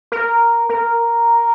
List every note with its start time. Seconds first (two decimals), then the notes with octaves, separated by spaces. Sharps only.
0.12 A#4
0.69 A#4